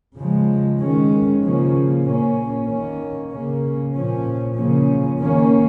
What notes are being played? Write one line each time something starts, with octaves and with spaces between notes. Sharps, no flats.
C#3 F3 G#3
D#3 G#3 C#4
C#3 F3 A#3 C#4
A#2 A#3 C#4
D#3 A#3 C#4
C#3 A#3 C#4
A#2 F3 C#4
C#3 F3 A#3 C#4
D#3 A#3 C#4